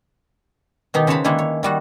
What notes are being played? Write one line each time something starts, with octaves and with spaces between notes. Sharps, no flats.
B2 D#3 D#4 G4
C#3 C5 C#5 F#5 A5 B5
D3 D#3 G#3 A#3 E4
C#5
D#3 G3 F#4